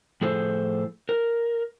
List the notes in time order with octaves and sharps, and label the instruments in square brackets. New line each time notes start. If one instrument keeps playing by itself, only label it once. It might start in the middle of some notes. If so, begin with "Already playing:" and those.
[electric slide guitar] A2 F3 G#4 A4 C5
A#4